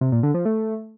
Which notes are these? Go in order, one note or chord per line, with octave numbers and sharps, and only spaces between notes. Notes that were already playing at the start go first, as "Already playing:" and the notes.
C3
A#2
D3
F3
A3